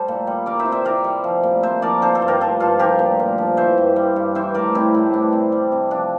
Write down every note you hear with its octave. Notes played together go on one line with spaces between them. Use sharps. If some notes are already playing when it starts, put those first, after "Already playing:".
Already playing: G3 A4 C5
A#2
G3
G3 A#4 D5
C5 E5
C3
C5 E5
C3 A#4 D5
G3
F3
A#2
A#2 C5 E5
F3 A#4 D5
D3 A4 C5
A4 C5
G2
G4 A#4
F3 F4 A4
G2 F4 A4
F3 G4 A#4
A#2
A#2
F3
E3 C5 E5
G2
G3
G2
E3 C5 E5
A2 A#4 D5
G3 C4 E4
A2
E3 D4
C3
G3
C3
F3 D4